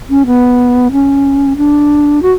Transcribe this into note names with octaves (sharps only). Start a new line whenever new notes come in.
C#4
B3
C#4
D4
F#4